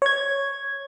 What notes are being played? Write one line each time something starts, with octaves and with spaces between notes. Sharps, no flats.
C#5 G#6